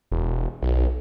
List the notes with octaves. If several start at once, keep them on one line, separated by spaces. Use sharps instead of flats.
E1
B1